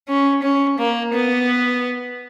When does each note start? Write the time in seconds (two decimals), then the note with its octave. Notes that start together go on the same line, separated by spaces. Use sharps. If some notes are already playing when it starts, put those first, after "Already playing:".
0.08 C#4
0.42 C#4
0.78 A#3
1.14 B3